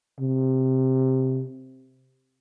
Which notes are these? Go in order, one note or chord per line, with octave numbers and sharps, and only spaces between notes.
C3